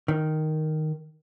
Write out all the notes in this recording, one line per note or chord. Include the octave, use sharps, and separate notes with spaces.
D#3